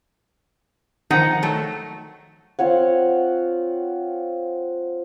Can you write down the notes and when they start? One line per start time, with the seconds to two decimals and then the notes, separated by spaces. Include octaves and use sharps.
1.10 D#3 F3 D#4 F#5 G5
1.42 F#3 A3
2.59 C4 F4 C#5 F#5